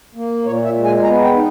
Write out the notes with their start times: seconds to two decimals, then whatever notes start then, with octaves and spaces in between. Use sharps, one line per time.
0.15 A#3
0.45 A#2 C#5
0.64 E5
0.75 G#3
0.85 G#5
1.03 B3 A#5
1.23 G5
1.33 D#4